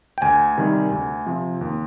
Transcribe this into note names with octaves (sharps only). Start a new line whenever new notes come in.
G5
D2 G#5
C3 D#3 G3
D2
C3 F3
D#2